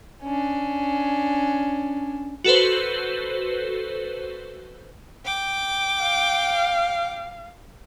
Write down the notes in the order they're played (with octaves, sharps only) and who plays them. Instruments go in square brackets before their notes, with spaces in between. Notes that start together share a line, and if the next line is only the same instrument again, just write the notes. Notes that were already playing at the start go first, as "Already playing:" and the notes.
[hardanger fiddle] C#4 D4
[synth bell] F#4 A4 B4 C5
[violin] G5 D6
[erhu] F5